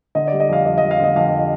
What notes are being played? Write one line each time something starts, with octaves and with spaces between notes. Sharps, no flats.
D3 D#5
G3 D5
D#5
F2 F5
F2 D#5
F2 D#5
F5
D3 D#5
F2 F5